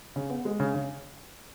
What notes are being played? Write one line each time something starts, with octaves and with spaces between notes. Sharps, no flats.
C#3
B3
G#3
C#3
C#3